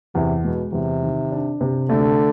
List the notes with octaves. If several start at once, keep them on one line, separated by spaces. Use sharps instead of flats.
E2 C3
B2 G#3
E2 C3
D#3
D4
C3
D3 A3